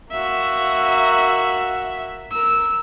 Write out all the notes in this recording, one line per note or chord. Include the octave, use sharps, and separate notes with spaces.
A#3 F#4 E5
A#4 E6